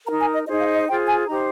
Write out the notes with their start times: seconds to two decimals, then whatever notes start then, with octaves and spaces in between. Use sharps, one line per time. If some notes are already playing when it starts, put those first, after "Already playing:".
0.06 D#4 A#4 A#5
0.20 G#5
0.32 D#5
0.46 D#4 G#4 C5 D#5
0.60 F5
0.73 D#5
0.87 F4 G#4 C5 G5
1.07 G#5
1.27 D#4 G4 C5 A#5